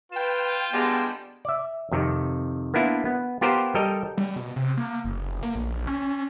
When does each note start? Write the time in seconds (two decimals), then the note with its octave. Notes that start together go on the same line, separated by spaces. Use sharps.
0.12 F4 B4 G5 E7
0.72 D3 G3 G#3 B3
1.45 D5 E5
1.92 F2 C3 D#3
2.74 A#3 B3 D4 E4 F4
3.05 B3
3.41 B3 F4 G4 A#4 C5
3.75 G3 A4 A#4 D#5 G5
4.18 G3
4.36 B2
4.56 C3
4.77 A#3
5.05 F#1
5.43 A#3
5.55 A#1
5.87 C#4